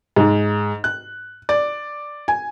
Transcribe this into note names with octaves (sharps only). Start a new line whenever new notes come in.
G#2
F#6
D5
G#5